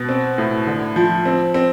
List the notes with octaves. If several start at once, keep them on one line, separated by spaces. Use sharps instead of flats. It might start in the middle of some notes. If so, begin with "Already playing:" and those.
Already playing: B2
C4
A2
D3
F3
C4
C4